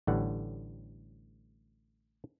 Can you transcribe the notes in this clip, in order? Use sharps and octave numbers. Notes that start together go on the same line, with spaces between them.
A1 A2 D3 G3 F#5